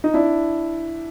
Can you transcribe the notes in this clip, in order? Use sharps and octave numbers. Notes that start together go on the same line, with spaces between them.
D#4
D4 E4